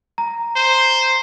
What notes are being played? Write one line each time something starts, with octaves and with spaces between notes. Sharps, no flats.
A#5
C5